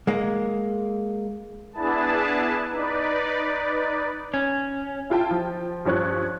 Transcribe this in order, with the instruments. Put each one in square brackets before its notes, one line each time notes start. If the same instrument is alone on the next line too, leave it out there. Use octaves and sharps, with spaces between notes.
[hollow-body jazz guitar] G#3 A#3
[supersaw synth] B3 D4 E4 G#4 B4 A5
D#4 B4 D5
[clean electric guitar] C#4
[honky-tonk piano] E4 F4 G5 A5
F3
G2 F3 C#4 C#5 F#6